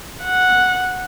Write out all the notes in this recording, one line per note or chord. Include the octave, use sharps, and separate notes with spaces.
F#5